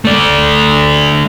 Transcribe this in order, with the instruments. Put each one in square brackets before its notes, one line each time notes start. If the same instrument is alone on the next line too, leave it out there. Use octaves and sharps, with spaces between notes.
[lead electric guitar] A3 D5